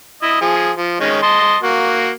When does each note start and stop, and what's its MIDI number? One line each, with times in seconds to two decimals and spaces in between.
0.23 0.37 64
0.23 0.37 75
0.41 0.71 53
0.41 0.71 68
0.77 1.00 53
1.00 1.18 51
1.00 1.18 56
1.00 1.18 61
1.23 1.56 75
1.23 1.56 81
1.23 1.56 84
1.63 2.10 58
1.63 2.10 66